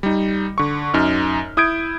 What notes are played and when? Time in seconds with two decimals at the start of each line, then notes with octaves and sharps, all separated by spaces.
0.03 G3 D#4
0.58 D3 C#6
0.94 F#2 D#4 F6
1.57 E4 D#6 G6 G#6 D7